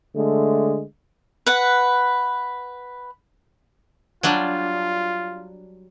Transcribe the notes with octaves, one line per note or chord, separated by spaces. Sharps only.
D3 G#3 A3
B4 F#5
F#3 G3 D4 F4